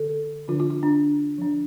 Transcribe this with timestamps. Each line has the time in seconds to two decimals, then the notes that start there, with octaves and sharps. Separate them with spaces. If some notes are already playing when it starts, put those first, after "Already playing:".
Already playing: D3 A4
0.48 D3 F3 D4 F4
0.60 F4
0.70 F4
0.83 D4
1.39 F3 D4